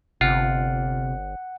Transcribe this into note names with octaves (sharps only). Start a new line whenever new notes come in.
G1 C3 F4 F#5